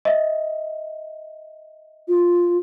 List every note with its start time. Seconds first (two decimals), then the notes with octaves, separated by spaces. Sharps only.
0.05 D#5 E5
2.08 F4